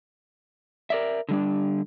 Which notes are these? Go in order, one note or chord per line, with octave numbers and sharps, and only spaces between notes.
A#4 D5 E5
D3 G3 D4